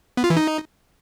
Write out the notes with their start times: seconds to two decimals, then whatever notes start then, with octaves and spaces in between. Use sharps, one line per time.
0.17 B3
0.24 F4
0.30 E3
0.37 D#4